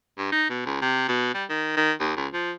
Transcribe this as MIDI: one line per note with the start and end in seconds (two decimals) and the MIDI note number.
0.18 0.32 43
0.32 0.45 63
0.50 0.65 47
0.66 0.78 37
0.82 1.05 48
1.08 1.29 47
1.34 1.44 55
1.49 1.76 51
1.76 1.92 51
2.00 2.12 39
2.17 2.27 37
2.33 2.52 53